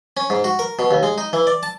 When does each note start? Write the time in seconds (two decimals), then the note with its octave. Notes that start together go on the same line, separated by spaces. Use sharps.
0.17 C#4
0.30 G#2
0.44 F#4
0.59 A#4
0.79 B2
0.91 D#2
1.03 G#3
1.18 D#4
1.33 E3
1.47 D5
1.63 A5